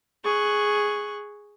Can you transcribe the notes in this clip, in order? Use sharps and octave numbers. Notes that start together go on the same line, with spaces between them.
G#4 C#6 F#6